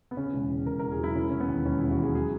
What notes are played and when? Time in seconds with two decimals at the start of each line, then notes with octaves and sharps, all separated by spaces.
0.11 B3
0.17 C#3 C#4
0.33 E1
0.49 C#3
0.66 E1 A#4
0.79 A#4
0.83 E2
0.92 G#4
0.99 F#3 E4
1.15 E1 C#4
1.30 E1 C#4
1.40 B3
1.48 D#2
1.66 E1 C#4
1.78 E1 E4
1.90 F#4
1.99 D#2 G#4
2.15 F#3 G#4